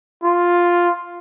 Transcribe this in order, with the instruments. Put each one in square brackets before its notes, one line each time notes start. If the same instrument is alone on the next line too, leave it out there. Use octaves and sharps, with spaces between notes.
[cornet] F4